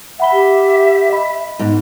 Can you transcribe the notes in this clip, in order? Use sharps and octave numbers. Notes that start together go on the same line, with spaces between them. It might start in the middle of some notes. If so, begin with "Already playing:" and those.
E5 F#5 B5 G7
G4
D#5 B5
G#2 B3